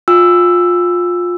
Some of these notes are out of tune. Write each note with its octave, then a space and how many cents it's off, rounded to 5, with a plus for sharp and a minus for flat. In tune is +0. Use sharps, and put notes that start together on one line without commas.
F4 +20 G#5 -40 E6 +5